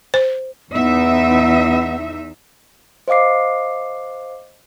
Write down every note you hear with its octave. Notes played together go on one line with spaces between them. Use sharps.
C5
E2 B3 D#4 E5
C5 D#5 F5 D6 C7